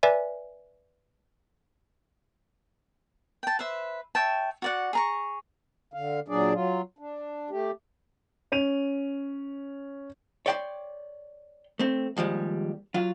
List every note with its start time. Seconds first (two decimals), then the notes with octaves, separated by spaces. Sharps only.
0.03 B4 D5 E5 G#5
3.43 G5 A5
3.59 B4 C5 E5
4.15 C#5 E5 G5 A5
4.62 F#4 D5 F#5
4.93 G#4 A#5 C#6
5.94 D3 F5
6.28 A#2 F#3 D4 G#4 D5
6.53 F#3 F4
6.98 D4
7.50 A3 G4
8.52 C#4 D#7 F7
10.46 C#5 D5 G5 B5 C6
11.79 A3 C4
12.17 D#2 F3 G3 G#3
12.94 F#3 F4